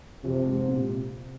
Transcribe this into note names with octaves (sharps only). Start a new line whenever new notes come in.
F2 C3
G#2
A#2
C3